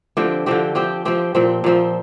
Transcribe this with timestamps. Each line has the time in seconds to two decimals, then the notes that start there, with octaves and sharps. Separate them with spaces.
0.17 D3 F3 C4 G4
0.46 D3 F3 C4 G4
0.75 F3 C4 G4
1.05 F3 C4 G4
1.35 A#2 F3 C4
1.64 A#2 F3 C4